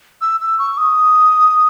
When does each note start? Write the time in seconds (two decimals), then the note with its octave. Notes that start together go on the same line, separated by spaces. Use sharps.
0.21 E6
0.40 E6
0.59 C#6
0.77 D#6